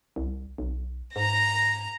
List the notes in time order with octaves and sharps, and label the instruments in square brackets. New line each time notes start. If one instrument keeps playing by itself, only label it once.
[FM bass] C2
B1
[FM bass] G#2 [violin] A#5 A#6